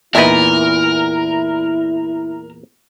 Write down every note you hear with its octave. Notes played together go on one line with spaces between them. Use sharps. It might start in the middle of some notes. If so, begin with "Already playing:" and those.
E2 A#2 D#4 E4 A#4 B4 E5